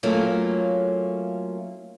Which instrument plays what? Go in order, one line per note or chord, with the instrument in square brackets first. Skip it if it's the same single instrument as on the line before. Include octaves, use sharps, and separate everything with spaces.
[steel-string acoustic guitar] F#3 A3 A#3 C#4 F4